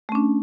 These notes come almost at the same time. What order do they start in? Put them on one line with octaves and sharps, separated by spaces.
A3 C#4 D4